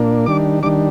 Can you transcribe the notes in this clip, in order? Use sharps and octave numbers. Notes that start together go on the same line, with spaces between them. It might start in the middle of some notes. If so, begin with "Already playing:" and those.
Already playing: A#2 A#3 D4
D#3 G3 D4 D6
D#3 G3 D4 D6